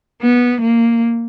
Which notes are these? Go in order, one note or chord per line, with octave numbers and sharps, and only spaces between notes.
B3
A#3